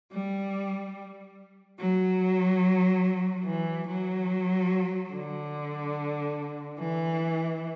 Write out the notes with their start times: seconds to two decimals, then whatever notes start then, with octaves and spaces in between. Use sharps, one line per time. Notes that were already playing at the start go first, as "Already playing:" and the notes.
0.12 G3
1.79 F#3
3.45 E3
3.87 F#3
5.13 D3
6.79 E3